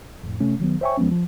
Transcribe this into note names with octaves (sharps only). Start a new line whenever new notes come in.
F2 A2
C3 A3 C#4
D#3 F#3 B3
C5 C#5 E5 G5 G#5 C#6
E2 F3 G#3 B3 C#4
F3